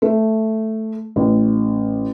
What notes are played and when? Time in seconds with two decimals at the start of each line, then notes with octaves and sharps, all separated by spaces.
0.02 A3
1.16 A1